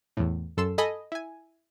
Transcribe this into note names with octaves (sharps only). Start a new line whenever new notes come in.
E2 A2
F#2 A4 C6 E6
A4 D#5 G#5 B5
E4 G#5